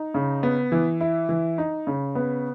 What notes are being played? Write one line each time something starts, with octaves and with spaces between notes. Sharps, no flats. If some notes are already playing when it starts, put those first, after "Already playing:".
Already playing: D#4
C#3
B3
E3
E4
E3
D#4
C#3
B3